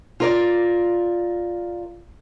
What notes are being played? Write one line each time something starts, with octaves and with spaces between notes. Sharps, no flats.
F4 A#4 D5